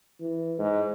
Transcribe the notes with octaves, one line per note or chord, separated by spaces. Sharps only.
E3
G#2